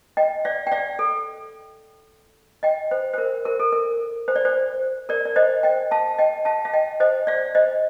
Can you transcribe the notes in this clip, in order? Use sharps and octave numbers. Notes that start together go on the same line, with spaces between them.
D#5 G5
D5 F5
G5
D5 F5
A4
D#5 G5
C5
C5
A#4
A#4
A4
A#4
C5
D5
C5
A#4 D5
D5
C5 D#5
D#5 G5
F5 A5
D#5 G5
F5 A5
F5
D#5 G5
C5 D#5
D5 F5
C5 D#5